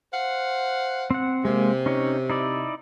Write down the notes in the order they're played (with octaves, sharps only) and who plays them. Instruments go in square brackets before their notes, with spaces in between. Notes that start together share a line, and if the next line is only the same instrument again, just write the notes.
[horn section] C5 F5 F#5
[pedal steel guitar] C4 F#5
[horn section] C3 [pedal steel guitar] G#3 A#3
[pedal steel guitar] C#4 D#4 C#5
D#4 E4 D5